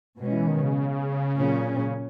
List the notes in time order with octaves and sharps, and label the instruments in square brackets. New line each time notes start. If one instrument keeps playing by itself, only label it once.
[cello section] B2 G#3 C#4
[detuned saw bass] E3
D#3
C#3
[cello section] A#2 F#3 C#4